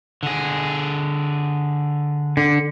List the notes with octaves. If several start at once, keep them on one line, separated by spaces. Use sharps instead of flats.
D3 G#4
D3